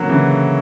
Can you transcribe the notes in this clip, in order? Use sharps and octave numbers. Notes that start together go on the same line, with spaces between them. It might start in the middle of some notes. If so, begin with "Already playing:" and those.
Already playing: D3 F#3 A#3 C#4
C#3 E3